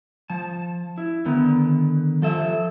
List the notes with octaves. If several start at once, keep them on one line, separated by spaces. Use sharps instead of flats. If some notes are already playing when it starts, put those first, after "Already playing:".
F3 A5
E4
D3 D#3 B3
F3 A4 E5